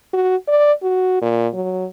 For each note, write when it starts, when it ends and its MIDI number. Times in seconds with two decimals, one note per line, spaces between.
0.13 0.36 66
0.48 0.73 74
0.82 1.19 66
1.21 1.48 46
1.54 1.86 54